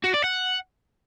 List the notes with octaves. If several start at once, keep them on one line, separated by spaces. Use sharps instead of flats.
F#4
D5
F#5